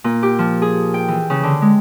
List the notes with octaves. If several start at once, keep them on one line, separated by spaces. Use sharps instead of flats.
A#2
G4
F3
G#4
G5
E3
C#3
D3
G#3